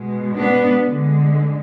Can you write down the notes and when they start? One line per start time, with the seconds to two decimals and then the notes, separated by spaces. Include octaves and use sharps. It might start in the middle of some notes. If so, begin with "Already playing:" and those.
Already playing: B2 G#3
0.36 B3 D4
0.87 D3 G#3